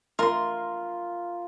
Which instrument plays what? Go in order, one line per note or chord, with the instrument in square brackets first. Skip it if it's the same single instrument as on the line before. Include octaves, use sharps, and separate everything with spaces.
[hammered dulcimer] F4 [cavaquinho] A#4 C6